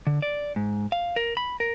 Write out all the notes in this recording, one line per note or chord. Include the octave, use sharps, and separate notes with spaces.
D3
D5
G#2
F5
A#4
B5
A#4